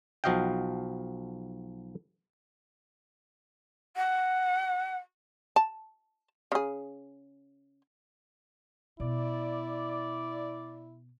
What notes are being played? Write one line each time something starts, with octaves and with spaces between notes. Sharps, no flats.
B1 F3 F#4 D#5 F5 G5
F#5
A5
C#3 G#4
B2 E4 D5